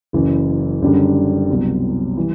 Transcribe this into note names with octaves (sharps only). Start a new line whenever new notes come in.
F#1 F#2 E3
F#1 F#2 D3 G3 D4
C2 B2 F#3
E3 G3